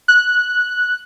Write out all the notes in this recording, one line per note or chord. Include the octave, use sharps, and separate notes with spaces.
F#6